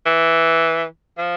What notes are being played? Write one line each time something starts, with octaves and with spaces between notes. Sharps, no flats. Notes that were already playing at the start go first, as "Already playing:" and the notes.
E3
F3